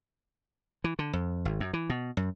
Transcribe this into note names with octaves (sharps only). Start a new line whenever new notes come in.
E3
D3
F2
G#1
F#2
E3
B2
F#2